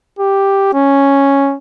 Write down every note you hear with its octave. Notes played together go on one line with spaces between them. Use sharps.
G4
C#4